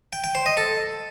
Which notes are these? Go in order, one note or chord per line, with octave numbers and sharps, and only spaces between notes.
G5
G5
C5
D#5
A4